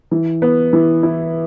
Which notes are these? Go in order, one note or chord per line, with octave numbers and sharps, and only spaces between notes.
E3
B3
E3
E4